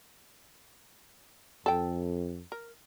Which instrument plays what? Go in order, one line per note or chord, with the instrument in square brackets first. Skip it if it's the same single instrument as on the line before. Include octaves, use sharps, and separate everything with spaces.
[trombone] F2 [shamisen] A4 G5
[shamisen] A#4